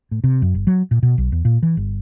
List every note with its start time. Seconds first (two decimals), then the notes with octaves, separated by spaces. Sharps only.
0.11 A2
0.24 C3
0.42 F#2
0.54 G1
0.67 F#3
0.91 A#2
1.03 B2
1.18 B1
1.32 E2
1.45 A#2
1.63 E3
1.77 G1